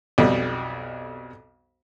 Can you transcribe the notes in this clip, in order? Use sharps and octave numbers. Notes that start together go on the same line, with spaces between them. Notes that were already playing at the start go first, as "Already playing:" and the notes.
B1 F2 B2 G3